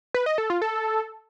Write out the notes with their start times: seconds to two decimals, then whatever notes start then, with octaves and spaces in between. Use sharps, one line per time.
0.14 B4
0.26 D#5
0.38 A4
0.50 F4
0.62 A4